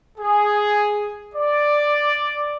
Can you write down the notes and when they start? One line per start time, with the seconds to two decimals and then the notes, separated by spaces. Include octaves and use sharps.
0.18 G#4
1.34 D5